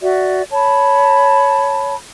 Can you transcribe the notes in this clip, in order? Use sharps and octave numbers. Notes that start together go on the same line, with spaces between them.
F#4 D5 E5
C#5 A5 B5